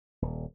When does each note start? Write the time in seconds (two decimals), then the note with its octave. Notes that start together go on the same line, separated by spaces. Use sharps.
0.22 D#1